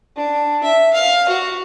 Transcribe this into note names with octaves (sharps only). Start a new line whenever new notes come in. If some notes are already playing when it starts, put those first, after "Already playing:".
D4
E5
F5
F#4